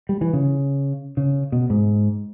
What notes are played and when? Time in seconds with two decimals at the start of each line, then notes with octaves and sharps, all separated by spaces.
0.09 G3
0.21 E3
0.33 C#3
1.17 C#3
1.52 B2
1.70 G#2